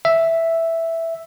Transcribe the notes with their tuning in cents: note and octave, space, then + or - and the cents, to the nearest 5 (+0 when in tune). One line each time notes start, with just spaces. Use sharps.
E5 +0